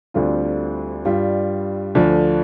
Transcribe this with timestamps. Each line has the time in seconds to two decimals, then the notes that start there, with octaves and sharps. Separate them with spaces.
0.14 D2 D3 G3 C4 F4
1.05 G2 G3 F4
1.95 D2 D3 F3